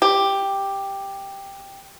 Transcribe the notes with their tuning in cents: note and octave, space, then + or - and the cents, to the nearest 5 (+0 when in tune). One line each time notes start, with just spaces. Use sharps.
G4 +5